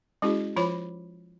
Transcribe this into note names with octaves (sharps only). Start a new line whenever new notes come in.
G#3 C#4 E4 F#4 G#4
F3 F4 C5 C#5 B5 D6